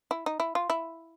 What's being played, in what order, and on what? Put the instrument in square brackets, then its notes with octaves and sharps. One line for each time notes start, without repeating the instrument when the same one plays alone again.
[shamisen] E4
D#4
E4
F4
E4